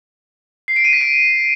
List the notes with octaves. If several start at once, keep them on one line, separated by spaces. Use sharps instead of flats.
C7
D7
D#7
B6
D7